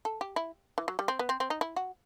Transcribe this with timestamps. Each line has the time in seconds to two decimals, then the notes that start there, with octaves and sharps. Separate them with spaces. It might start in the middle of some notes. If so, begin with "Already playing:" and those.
0.05 A4
0.21 G4
0.36 E4
0.78 E3
0.88 F#3
0.99 G3
1.08 C4
1.19 B3
1.29 C4
1.40 C4
1.50 D#4
1.61 E4
1.76 F#4